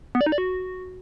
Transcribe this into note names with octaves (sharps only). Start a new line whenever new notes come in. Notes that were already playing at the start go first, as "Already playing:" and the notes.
B3
D5
D#4
D5
F#4